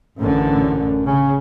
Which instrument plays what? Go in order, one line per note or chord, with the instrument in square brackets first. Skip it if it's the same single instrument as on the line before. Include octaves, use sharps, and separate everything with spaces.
[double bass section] A1 D3 [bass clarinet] F#2
[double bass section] C#3 [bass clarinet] C#4